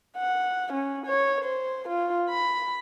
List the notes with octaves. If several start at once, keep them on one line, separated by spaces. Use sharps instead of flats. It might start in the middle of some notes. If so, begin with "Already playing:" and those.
F#5
C#4
C#5
C5
F4
B5